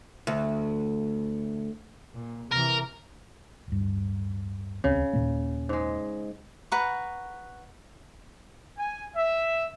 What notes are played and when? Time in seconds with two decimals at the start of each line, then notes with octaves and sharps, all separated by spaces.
0.27 D2
2.13 A#2
2.51 C3 E3 A#4
3.67 D1 G2
4.84 D#1 C#2 C#3 C4
5.13 D#2 A#2 A#3
5.69 G#2 G#3
6.72 B4 F#5 A#5 C#6
8.77 G#5
9.16 E5